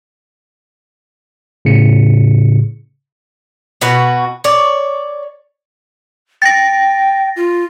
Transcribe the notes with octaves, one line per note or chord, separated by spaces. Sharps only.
A2 C#3 C#7
B2 F#4 B4
C#5 D5
G5 A6 A#6
F4